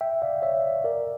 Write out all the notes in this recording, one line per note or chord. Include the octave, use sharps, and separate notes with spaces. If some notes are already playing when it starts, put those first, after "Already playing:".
E5 G5
D5 F5
C#5 E5
A#4 D5